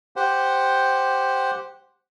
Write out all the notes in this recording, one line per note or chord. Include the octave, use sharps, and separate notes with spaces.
G4 C5 F#5